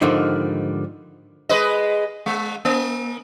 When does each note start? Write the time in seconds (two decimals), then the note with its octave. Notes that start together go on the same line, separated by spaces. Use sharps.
0.01 G#2 D3 D#3 F3 G3
1.49 G#3 B4 D#5
2.26 G#3
2.65 A#3